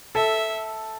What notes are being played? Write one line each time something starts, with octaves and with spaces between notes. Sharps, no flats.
A4 E5